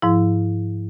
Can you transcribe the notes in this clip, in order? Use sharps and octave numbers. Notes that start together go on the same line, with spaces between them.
G#2 F3 E4